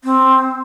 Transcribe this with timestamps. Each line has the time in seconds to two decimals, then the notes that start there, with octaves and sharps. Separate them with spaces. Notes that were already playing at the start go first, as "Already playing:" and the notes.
0.04 C4